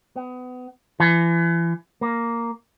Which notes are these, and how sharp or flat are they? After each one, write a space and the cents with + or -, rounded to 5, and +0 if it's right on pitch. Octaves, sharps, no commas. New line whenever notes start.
B3 +30
E3 +35
A#3 -5